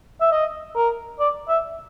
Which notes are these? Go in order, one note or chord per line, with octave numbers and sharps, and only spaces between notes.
E5
D#5
A#4
D5
E5